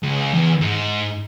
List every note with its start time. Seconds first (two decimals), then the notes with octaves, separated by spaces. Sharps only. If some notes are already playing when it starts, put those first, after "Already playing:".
0.03 C#2
0.34 E2
0.61 G#2